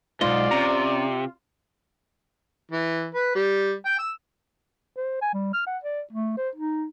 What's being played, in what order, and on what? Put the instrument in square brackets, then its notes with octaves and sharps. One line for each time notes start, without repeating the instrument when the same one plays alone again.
[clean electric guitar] B1 E2 D#5 [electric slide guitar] G#2 [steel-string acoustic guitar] F4 [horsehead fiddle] D5
[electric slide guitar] C3 [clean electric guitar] C#4 A#5
[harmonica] E3
B4
G3
G5
E6
[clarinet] C5
G#5
G3
F6
F#5
D5
A3
C5
D#4